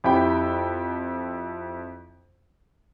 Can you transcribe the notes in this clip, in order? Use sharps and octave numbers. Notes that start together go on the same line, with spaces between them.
F2 E4 G4 G5 B5